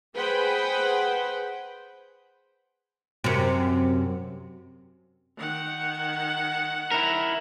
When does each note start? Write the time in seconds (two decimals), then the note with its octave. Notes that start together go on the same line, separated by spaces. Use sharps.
0.15 G#4 B4 C5 F#5 G5 B5
3.24 F#2 C3
5.38 D#3 F#5
6.92 E4 A#4